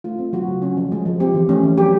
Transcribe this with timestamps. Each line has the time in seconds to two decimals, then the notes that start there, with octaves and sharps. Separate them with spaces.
0.04 A3 F4
0.19 C4
0.33 F#3 F#4
0.48 C#3
0.62 C#4
0.77 F3
0.92 G#3
1.05 F3
1.20 C4 G4
1.34 E3
1.49 A3 C#4
1.63 E3
1.78 F#3 G4